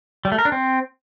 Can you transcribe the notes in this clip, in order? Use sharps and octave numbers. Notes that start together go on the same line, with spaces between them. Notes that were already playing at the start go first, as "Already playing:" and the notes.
G3
A3
A#4
D4
C4